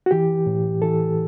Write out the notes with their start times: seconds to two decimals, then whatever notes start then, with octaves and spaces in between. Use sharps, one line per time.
0.06 F#4
0.11 E3 G4
0.46 A2
0.82 E3 A4